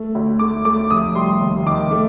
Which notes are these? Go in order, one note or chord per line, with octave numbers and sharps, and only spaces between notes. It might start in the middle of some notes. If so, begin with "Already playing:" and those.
Already playing: A3
D2
A3 D6
A3 D6
F1 D#6
G3 C6
D#2
D#3 D6
A3